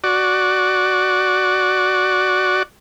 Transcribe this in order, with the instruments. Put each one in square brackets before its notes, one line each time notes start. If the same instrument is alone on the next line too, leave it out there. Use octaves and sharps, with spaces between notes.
[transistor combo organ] F#4 D5